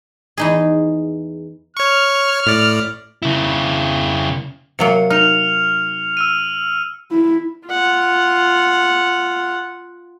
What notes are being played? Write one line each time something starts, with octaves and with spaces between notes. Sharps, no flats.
E2 D#4 G#4
C#5 C#6 F6
A2 D5
C#3 E4
C3 F#3 A#3 C#7
D#4 F6 F7
E6 F6 D#7
E4
F4 F#5